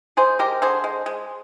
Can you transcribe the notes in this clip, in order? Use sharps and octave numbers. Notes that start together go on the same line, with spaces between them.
G#3 G#4 C5
G#3 G4 A#4
D3 G#4 C5
G#3
G#3